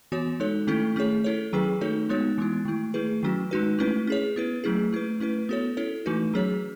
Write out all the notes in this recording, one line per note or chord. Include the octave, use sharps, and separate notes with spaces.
E3 B3 F#4 C#5
G#3 D#4 A4 C#5
D#3 A3 C#4 E4 A4
A3 C#4 G#4 C#5
C#4 E4 A4 C#5
D#3 F#3 C#4 G#4 B4
A3 D#4 F#4 A4 C#5
G#3 B3 D#4 F#4 C#5
E3 G#3 B3 E4
D#3 A3 E4
A3 E4 G#4 B4
D#3 F#3 C#4 F#4
G#3 D#4 F#4 B4
A3 C#4 E4 B4
C#4 G#4 C#5
B3 E4 B4
F#3 A3 C#4 E4 G#4
A3 E4 B4
A3 C#4 E4 B4
B3 F#4 A4 C#5
C#4 E4 A4 C#5
E3 A3 D#4 F#4 B4
F#3 C#4 G#4 C#5